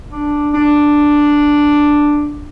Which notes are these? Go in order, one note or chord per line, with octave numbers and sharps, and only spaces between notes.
D4
D4